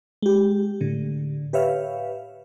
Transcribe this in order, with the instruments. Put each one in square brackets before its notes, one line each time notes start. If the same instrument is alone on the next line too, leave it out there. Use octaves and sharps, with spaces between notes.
[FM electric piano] G#3 G4
A2 D3
G4 B4 C#5 E5 F5